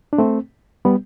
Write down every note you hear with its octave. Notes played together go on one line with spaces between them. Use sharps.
D4
A3 C4
G3 B3